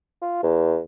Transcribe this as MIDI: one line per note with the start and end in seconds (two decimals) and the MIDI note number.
0.21 0.43 65
0.43 0.80 40